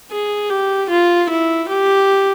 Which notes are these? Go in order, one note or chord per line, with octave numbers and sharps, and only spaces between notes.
G#4
G4
F4
E4
G4